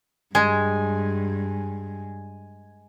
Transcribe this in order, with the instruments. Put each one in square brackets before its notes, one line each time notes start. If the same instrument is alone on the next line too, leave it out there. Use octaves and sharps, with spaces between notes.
[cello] G2 [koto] G#3 [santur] G#5